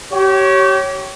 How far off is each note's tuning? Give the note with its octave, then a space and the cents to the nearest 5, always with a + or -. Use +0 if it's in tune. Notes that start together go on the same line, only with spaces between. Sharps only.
G4 -30 C#5 +0